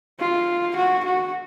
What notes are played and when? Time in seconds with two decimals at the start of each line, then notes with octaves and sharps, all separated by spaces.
0.19 F4
0.77 F#4
1.05 F#4